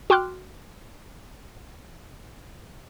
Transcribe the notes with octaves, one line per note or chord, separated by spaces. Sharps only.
F#4 G5 C6 D6 F6 F#6